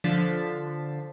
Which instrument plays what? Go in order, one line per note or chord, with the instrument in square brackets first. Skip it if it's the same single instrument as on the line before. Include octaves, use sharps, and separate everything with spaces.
[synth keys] D3 F3 A5 A6 B6 C7